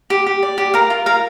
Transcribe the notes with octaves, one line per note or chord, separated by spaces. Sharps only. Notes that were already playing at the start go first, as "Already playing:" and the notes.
G4
G4
D5
G4
A#4 F5
F4
A#4 F5